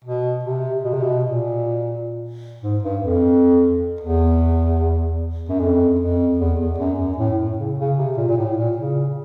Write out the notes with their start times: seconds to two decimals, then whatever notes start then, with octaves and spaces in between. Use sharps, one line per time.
0.04 B2
0.45 C3
0.85 B2
0.94 C3
1.03 B2
1.24 A#2
2.63 G#2
2.83 G2
3.02 F2
4.01 E2
5.49 F#2
5.60 F2
5.99 F2
6.39 E2
6.59 E2
6.79 F#2
6.98 F#2
7.18 A2
7.38 A2
7.58 C#3
7.78 C#3
7.97 C3
8.17 A#2
8.29 A#2
8.37 A2
8.57 A#2
8.77 C#3